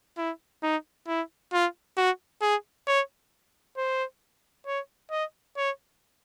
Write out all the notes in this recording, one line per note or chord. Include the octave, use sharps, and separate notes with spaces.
E4
D#4
E4
F4
F#4
G#4
C#5
C5
C#5
D#5
C#5